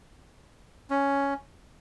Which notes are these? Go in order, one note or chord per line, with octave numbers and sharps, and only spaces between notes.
C#4